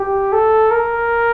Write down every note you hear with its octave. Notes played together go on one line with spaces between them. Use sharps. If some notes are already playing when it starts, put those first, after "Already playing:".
Already playing: G4
A4
A#4